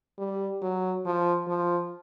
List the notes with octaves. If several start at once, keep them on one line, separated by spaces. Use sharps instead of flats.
G3
F#3
F3
F3